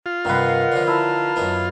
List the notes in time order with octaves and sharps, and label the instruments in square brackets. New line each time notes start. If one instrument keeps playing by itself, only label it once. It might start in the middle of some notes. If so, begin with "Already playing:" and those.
[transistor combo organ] F4
[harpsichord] G2 C3 C4 [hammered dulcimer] D#3 B4 [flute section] D#5 F5 F#5
[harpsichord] D3 F3
[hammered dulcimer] E4 [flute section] A5 A#5
[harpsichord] F#2 D#3 B3